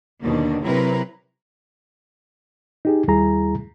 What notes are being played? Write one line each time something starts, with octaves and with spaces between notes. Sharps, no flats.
D#2 B2 D3 D#3 A#3 D4
C3 F#3 C4 E4 A#4 B4
D#4 G4 G#4
D#2 G3 E4 G#4 A#5